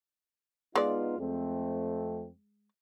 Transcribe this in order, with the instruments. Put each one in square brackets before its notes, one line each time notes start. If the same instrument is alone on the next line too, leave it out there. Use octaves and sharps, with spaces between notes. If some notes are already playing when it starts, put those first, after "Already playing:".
[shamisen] G#3 D5 [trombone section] B3 D#4 F4
[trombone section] F2 A3 C4